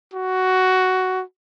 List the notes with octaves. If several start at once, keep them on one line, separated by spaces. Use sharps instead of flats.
F#4